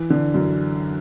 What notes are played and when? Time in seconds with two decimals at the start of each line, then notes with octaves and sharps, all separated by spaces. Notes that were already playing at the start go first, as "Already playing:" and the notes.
Already playing: E3
0.10 D3
0.34 F#2